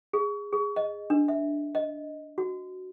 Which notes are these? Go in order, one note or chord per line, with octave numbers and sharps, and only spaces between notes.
G#4
G#4
D#5
D4
E5
D#5
F#4